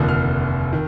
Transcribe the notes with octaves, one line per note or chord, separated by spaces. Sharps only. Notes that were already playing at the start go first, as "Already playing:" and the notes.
Already playing: F1 D#2 D3 F3
F6
D#3